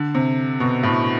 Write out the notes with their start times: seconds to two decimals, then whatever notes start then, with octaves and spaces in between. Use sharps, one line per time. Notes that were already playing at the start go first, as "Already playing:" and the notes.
Already playing: D3
0.15 C3
0.60 B2
0.83 A2